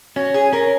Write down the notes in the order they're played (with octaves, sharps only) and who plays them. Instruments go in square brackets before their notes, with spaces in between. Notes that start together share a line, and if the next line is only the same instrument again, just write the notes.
[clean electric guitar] C#4 [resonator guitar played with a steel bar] F#4
[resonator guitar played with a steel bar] G#4
[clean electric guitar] C#4 [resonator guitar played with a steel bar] A#4